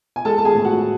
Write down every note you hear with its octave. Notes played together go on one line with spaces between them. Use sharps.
G#5
G#3 A4 A5
A5
G#4 G#5
A2
F#4 F#5